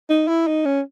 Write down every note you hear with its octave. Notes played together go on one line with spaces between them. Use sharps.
D#4
E4
D#4
C#4